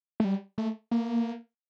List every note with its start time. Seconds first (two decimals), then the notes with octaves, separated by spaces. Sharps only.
0.20 A3
0.24 G3
0.58 A3
0.91 A#3